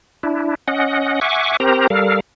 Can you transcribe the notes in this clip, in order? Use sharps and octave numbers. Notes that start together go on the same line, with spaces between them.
D4 E4
C#4 D#5 F#5
E5 F#5 G#5 C#6 D6
C4 G4 A#4 C5 A#5
G3 A4 A#4 F5